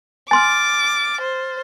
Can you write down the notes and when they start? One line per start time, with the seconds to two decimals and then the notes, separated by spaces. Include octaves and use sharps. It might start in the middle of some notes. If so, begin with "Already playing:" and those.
0.31 G#5 C6 D6 F6 A6
1.21 C5